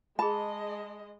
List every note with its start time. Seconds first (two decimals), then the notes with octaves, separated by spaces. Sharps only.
0.19 G#3 G#4 D#5 A5 B5